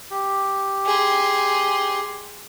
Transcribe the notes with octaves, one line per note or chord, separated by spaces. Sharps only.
G4
G#4 C6